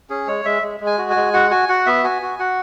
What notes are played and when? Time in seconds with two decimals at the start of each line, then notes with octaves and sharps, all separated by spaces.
0.10 C#4 G#4
0.27 G#3 C#5
0.45 G#3 E5
0.63 G#3
0.80 G#3
0.87 G#5
0.98 F#4
1.10 G#5
1.16 G#3
1.33 F#4 F#5
1.51 F#4 G#5
1.69 F#4 F#5
1.86 B3 E5
2.04 F#4 G#5
2.22 F#4
2.39 F#4 F#5